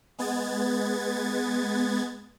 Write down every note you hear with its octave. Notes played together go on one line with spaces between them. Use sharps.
G#3 B3 G#6 A6